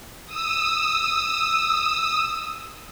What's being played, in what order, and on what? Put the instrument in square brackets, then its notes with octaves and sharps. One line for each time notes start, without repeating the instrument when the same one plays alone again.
[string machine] D#6 E6